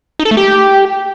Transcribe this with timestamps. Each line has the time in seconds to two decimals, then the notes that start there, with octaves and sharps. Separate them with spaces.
0.19 D#4
0.25 A4
0.31 A3
0.37 G4